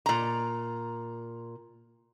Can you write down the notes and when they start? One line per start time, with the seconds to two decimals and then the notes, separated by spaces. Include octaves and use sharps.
0.06 A#2 A#5